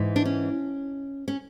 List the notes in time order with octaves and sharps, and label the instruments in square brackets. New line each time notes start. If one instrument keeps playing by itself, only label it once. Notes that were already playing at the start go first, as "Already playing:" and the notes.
Already playing: [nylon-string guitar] G#2 E3
D4
C#4
C#4